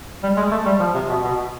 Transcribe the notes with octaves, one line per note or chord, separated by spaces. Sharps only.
G3
G#3
A3
G3
F3
C3
B2
B2